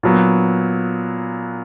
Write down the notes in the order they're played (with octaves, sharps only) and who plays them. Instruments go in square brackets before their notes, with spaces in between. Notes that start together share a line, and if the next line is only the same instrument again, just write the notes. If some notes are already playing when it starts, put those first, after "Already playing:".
[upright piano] A#2 F#3 B3